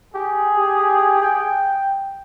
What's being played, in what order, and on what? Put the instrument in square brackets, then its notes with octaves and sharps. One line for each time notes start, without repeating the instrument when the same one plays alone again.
[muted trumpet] G4 [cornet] G#4
[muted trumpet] G4
G5